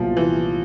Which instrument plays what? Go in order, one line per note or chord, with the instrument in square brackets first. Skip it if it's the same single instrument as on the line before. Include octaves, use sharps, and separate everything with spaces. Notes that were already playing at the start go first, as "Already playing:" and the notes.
Already playing: [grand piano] C2 A#2 F#3 B3 [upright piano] F3
[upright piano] E3